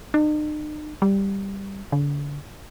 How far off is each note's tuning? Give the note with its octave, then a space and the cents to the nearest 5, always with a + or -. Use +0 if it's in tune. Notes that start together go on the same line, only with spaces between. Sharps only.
D#4 -45
G3 +5
D3 -35